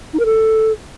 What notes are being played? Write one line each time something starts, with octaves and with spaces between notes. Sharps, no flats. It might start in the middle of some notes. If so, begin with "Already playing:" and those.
D#4
A#4
A4